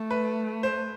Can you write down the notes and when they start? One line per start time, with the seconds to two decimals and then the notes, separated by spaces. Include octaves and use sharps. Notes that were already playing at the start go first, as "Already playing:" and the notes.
Already playing: A3
0.11 B4
0.63 C5